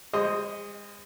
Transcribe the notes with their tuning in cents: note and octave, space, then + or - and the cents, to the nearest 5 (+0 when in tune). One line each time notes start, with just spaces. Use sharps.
G#3 -40 C5 +0 D#5 +0